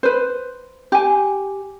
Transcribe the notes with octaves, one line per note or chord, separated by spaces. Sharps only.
B4 C5
G4 G#5